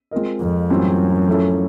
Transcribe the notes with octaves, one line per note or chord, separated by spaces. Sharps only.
G#3 C4 F4 A#4 D#5
F2
F#2 A2 E3 G3 C4 F4
F3 A3 C#4 E4 A4